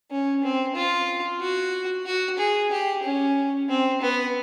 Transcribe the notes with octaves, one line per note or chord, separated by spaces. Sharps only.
C#4
C4
F4
F#4
F#4
G#4
G4
C#4
C4
B3